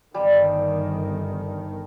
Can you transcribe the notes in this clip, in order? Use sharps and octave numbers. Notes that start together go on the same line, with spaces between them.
G1 D#3 G3 A5